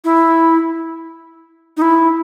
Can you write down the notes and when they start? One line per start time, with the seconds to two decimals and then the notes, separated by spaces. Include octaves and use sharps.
0.04 E4
1.77 D#4
1.82 E4